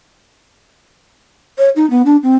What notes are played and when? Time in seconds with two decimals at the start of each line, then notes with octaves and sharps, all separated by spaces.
1.58 C#5
1.76 D#4
1.90 B3
2.05 D4
2.23 C4